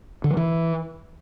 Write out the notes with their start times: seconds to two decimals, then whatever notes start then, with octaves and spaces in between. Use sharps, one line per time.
0.24 D3
0.31 F3
0.37 E3